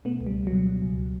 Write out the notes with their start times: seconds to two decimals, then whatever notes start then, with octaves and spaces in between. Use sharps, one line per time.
0.05 B2 A3 B3
0.21 C#2
0.27 G3
0.36 C#2
0.47 F#3
0.52 B2
0.67 B2
0.82 C#2